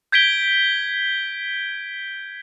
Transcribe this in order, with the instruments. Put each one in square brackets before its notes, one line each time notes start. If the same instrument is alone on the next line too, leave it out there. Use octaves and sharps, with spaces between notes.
[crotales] G6 G#6 B6 D7 G7